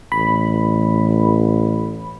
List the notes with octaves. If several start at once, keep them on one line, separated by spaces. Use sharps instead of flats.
A1 B5